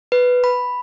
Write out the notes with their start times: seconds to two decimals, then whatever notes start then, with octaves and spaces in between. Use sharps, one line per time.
0.12 B4
0.44 B5